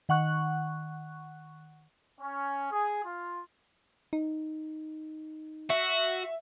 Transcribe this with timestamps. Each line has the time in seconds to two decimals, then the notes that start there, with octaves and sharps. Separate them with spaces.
0.09 D#3 F#5 C#6 F#6
2.20 C#4
2.71 G#4
3.04 F4
4.13 D#4
5.70 F#4 E5